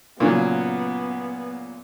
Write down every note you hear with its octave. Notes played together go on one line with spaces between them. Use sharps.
A#2 C#3 F#3 B3